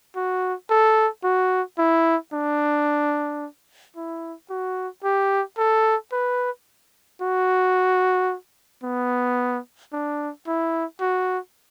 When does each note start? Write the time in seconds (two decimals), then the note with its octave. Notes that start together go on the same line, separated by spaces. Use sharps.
0.16 F#4
0.70 A4
1.24 F#4
1.78 E4
2.33 D4
3.96 E4
4.50 F#4
5.04 G4
5.58 A4
6.12 B4
7.22 F#4
8.83 B3
9.92 D4
10.47 E4
11.01 F#4